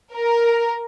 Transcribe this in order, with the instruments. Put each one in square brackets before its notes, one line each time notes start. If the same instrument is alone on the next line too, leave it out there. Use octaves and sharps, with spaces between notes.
[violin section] A#4